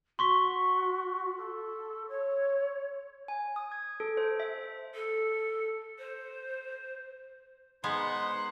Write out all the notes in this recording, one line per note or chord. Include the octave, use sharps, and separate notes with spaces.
F#4 C6 C#6 B6
A4
C#5
G#5
D#6
G#6
A4
C5
E5
A4
C5
G#3 B3 D#4 C5 F#5 B5